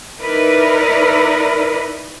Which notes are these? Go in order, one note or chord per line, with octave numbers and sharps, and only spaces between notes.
D#4 E4 A#4 B4 D5